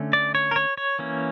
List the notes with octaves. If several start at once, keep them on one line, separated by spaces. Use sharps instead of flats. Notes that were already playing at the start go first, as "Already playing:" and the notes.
Already playing: D3 A3 C#4
D5
C#5
A#4
C#5
C#5
E3 A#3 C#4